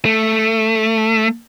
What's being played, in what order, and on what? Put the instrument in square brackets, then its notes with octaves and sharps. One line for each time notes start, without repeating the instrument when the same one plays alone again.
[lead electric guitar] A3